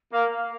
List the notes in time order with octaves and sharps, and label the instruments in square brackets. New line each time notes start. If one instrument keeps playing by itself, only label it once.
[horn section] A#3 [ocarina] F5